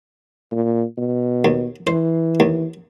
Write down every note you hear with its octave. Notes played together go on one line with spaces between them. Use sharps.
A#2
B2
D#2
E3 C5
D#2